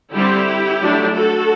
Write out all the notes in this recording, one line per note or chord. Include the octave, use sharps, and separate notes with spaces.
D3 G3 C4 E4 G4
F#3 A3 D4
F#4 A4